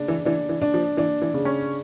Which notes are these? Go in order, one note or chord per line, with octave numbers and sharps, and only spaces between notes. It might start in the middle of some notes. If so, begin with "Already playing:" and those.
Already playing: C#3 D4
E3
E3 D4
E3
D4
F3
E3 D4
E3
C#3
C#4